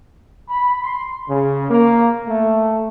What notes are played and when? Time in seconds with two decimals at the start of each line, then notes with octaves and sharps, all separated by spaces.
0.49 B5
0.83 C6
1.29 C#3
1.70 A#3
2.27 A3